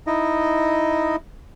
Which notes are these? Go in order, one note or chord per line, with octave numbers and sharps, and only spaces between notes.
D#4 E4 D#5